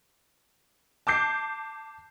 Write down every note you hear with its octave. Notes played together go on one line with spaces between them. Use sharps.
A5 D6 G6 C7